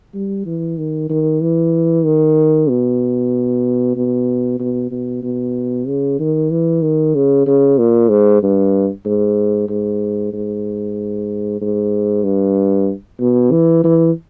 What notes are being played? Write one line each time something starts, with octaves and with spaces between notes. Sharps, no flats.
G3
E3
D#3
D#3
E3
D#3
B2
B2
B2
B2
B2
C#3
D#3
E3
D#3
C#3
C#3
A#2
G#2
G2
G#2
G#2
G#2
G#2
G2
B2
E3
E3